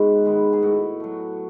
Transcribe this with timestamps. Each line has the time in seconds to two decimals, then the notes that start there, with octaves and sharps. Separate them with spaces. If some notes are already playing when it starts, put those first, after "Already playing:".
Already playing: G#2 G#3 B3 F#4
0.25 D#3 G#3 B3
0.53 G#4
0.62 A2 F#4
1.00 F#3 A3